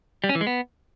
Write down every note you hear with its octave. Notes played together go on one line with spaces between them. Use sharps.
G3
C#4
E3
G#3
B3